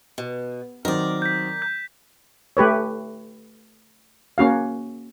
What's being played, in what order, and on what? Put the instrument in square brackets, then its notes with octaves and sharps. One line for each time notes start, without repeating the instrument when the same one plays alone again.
[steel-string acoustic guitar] B2
[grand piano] D#3 F#3 C4 [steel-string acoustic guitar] A#4 D5
[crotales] G6 B6
G6
[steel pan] A3 G4 B4 C#5
A#3 C#4 F#4 F5